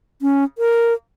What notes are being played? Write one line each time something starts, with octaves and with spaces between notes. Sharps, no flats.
C#4
A#4